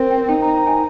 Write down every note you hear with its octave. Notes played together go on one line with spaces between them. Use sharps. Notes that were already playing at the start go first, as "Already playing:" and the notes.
Already playing: C4 A#4 C5
G5
D#4 G5
A#5
A#5
G#5